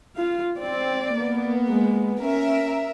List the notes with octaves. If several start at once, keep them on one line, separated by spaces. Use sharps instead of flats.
F4 F5
C4 D5
A#3 B3
G#3
C#4 A#4 E5